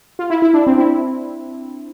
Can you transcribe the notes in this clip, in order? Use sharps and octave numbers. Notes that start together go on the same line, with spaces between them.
F4
E4
E4
D4
C4
E4